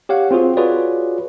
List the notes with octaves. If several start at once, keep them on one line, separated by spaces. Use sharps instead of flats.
G4 C#5 F5 F#5
C4 F4 F#4 G#4
F4 F#4 G#4 B4 C#5 D5